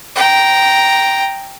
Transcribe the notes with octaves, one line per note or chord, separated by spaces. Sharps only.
G5 A#5